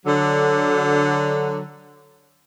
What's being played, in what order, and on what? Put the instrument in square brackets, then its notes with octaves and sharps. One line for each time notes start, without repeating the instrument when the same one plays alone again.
[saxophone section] D3 F#3